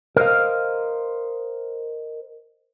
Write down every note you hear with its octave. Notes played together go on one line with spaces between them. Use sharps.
A#4 C5 D#5 F5